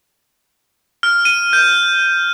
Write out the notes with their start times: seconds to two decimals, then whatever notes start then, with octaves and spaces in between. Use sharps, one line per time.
1.03 F6
1.25 D#7
1.53 G6